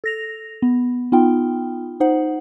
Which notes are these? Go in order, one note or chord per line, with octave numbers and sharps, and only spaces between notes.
A4 A#6 F7
B3
B3 D#4 F4 G5
D#4 C5 F#5